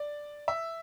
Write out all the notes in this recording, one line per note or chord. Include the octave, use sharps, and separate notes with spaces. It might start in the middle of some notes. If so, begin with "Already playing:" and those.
Already playing: D5
E5